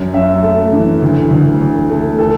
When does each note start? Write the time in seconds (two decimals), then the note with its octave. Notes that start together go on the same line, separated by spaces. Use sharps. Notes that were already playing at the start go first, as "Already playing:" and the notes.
Already playing: F#2
0.13 F#2 E5
0.43 A3
0.73 E3
1.02 D2
1.31 D2
1.61 D2
1.90 A3
2.18 A4